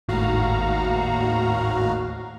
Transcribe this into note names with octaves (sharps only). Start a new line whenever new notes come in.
G#1 D#2 A2 F#4 F5 A#5